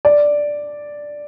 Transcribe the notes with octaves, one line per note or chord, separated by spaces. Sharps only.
D5